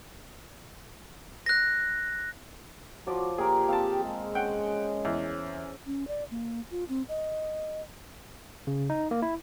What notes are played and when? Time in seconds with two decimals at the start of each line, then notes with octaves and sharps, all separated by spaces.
1.46 F#6 A#6
3.07 F3 F4 F#4 D5
3.38 A#2 G4 G#4 A#4 C6
3.69 C4 G#4 F5 A5
4.05 G#3
4.35 C#4 F#5 G5
5.05 E2
5.86 C#4
6.08 D5
6.31 A#3
6.71 F4
6.89 C4
7.09 D#5
8.67 C#3
8.90 D#4
9.11 A#3
9.22 E4